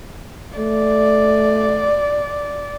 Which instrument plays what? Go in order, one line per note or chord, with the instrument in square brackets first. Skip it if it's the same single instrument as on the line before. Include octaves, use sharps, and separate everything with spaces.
[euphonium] A3 [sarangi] D5